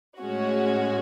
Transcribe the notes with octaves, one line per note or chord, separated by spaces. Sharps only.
A2 G#3 C#4 F#4